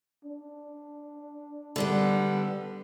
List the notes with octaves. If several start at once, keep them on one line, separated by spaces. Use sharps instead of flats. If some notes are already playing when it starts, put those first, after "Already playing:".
D4
D3 G3 B3